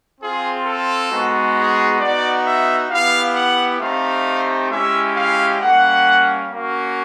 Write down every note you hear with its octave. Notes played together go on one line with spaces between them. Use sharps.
C4 F4 G#4
A4
G#3 B3 D#4 F#4
G#4
B3 D#4 F#4 D5
E5
B3 E4 G4 F5
F#5
A3 C4 D#4 G4 F5
G#3 C#4 E4 G4 E5
F5
G3 A#3 C#4 F#5
A#3 C#4 F#4